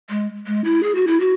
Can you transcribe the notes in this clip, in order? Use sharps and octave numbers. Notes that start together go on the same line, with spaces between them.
G#3
G#3
E4
G#4
F#4
E4
F#4